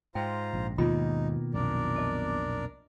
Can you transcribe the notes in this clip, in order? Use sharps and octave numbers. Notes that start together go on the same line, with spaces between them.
G#2 F4 C5 G5 A#5
A#1
D#2 G#2 B2 D#3 A#3 D#4 F4 B5
B1 F2 A#2 D4 A#4 D5
D#5 A5